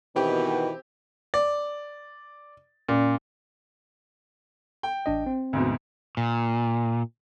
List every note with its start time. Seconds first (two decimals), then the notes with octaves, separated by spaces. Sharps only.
0.16 B2 D#3 E3 C4 G4
1.34 D5
2.89 A#2 C#4 D5
4.83 G5
5.06 A1 D4 D#5
5.26 C4
5.53 D2 G#2 B2
6.17 A#2